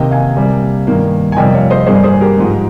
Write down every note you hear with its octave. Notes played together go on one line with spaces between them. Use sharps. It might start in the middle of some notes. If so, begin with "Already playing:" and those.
Already playing: C3 D#3 A#3 D#5 G5
F5 G#5
C3 G3 A#3
G2 D#3 A#3
G#5
F2 C3 G3 A#3 D#5 G5
C#5 F5
C5 D#5
G2 G3 A#3 G#4 C5
G#4 C5
G4 A#4
G#2 F3 G#3